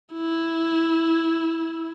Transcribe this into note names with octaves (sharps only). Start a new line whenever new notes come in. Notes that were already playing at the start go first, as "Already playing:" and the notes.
E4